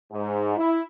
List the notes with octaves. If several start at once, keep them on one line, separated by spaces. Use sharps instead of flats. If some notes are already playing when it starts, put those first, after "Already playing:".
G#2
E4